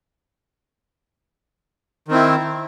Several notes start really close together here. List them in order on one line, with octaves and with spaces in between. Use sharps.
D#3 C4 E4